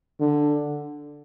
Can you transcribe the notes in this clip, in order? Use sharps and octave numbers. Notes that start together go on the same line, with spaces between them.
D3